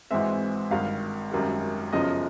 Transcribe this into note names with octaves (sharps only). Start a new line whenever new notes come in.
G#1 G#2 E3 G#3 C4 E5
G#1 G2 D#3 F5
G#1 F#2 D#3 G3
G1 F#2 C#3 F3 D#5